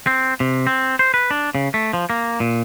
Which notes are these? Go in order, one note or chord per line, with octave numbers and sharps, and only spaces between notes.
C4
C3
C4
C5
B4
D4
C#3
A3
F3
A#3
A#2